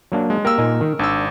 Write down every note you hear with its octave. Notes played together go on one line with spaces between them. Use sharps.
F#3 A#3 D4
G#3
A#3 G4 A#4 E6
A#2 D#4 G#5
D#3
G#1 D4 E6